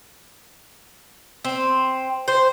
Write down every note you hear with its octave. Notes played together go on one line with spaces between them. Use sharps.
C4
C5